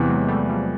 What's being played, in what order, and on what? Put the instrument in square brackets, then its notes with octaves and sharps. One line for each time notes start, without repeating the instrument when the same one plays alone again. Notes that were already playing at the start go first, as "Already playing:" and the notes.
Already playing: [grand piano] E2 C3 E3
[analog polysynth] F#3 G#3
G3 A3
F3 G3